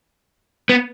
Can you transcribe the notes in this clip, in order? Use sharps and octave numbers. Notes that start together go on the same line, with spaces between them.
B3